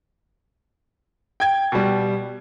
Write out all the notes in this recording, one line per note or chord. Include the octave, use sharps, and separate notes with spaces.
G5 G#6
B2 G3